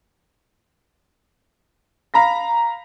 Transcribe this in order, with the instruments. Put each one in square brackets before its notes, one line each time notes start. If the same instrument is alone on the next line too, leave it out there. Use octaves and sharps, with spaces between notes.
[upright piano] F5 A#5 B5 A#6